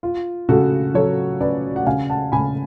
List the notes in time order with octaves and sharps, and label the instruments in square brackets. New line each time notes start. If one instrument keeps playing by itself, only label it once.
[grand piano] F4
C#3 F#4 A4
F#3 A4 C#5
C#4 B4 D5
F#5
C#3 F5 G#5
F#5 A5
C#3 G#5 B5